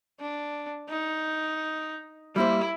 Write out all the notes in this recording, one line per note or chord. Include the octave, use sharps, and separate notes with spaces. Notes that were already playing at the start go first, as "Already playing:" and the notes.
D4
D#4
G3 A#3 E4 C5